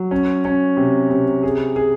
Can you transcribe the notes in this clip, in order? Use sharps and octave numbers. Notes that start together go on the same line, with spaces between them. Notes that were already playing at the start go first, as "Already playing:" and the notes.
Already playing: F#3
C#4
C#4
C3
C3
G#4
G#4